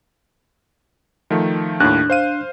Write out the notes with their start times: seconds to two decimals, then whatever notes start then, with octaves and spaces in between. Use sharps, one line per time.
1.30 D#3 F3 A3
1.80 D#2 A2 D4 F#6
2.10 C5 F5 D#7